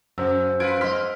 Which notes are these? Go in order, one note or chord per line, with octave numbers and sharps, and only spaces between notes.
F#2 C#3 C5 A#5 E6
F4 B4 G#6 D7
G#2 D#5 C6 F6 B6